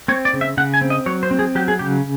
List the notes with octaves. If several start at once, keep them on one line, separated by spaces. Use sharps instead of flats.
C4 C#5
D5
C#3
E5
C#3 F#5
G#5
C4
D#5
F#3 C#5
C5
C4
G#4
F#3 G4
G#4
C#3 G4